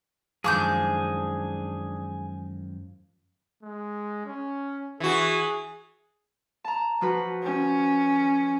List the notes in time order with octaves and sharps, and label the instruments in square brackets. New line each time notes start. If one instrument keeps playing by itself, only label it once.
[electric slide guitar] F#2 D#3 G#3 [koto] F3 [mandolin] D4 D6 G6 [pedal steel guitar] G#4
[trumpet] G#3
C#4
[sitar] E3 F#4 [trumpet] G#4
[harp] A5 A#5
F3 F#4 B4
[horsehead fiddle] C#4